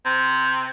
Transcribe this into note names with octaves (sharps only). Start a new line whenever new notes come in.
C3